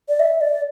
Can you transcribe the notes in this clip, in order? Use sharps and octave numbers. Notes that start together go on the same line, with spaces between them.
D5
E5
D5